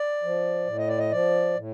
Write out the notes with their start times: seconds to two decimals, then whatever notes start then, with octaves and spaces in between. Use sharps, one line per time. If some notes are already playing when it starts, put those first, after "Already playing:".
Already playing: D5
0.23 F3
0.67 A2
0.78 D#5
0.88 D5
0.99 D#5
1.11 F3 D5
1.56 A2